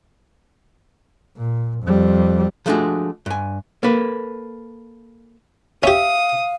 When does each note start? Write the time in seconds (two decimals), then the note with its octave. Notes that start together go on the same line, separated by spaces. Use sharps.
1.37 A#2
1.83 F2 G3
2.66 F3 G#3 A3 D4 F#4 G#4
3.26 G2 G#5
3.83 A#3 A4 B4
5.83 C#4 G4 E5 F5 D#6